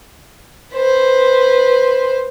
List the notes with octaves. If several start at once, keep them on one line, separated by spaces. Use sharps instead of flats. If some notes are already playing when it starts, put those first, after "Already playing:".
B4 C5